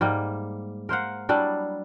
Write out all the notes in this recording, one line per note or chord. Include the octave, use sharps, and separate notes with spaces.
G#2 G3 A#3
A#4 C5 F5 F#5
F#3 G3 D4 E4